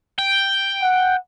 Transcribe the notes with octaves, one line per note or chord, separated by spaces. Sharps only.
G5
F#5